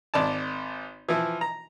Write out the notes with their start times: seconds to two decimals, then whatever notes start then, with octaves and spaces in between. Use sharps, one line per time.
0.14 G#1 D5 A5
1.09 E3 F3 E4
1.41 A#5